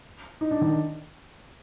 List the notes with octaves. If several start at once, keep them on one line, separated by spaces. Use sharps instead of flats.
D#4
D4
D#3 D#4